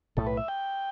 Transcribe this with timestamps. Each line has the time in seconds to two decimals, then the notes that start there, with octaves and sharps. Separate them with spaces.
0.17 B1 A2 A3 A4
0.26 B4
0.37 E5
0.48 G5